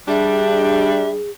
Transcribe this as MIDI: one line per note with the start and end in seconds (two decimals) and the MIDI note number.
0.08 1.21 55
0.08 1.21 62
0.08 1.30 68
0.08 1.10 76